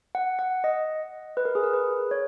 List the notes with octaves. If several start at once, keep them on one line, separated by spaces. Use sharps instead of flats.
F#5
F#5
D#5
B4
A#4
G#4
A#4
B4
C#5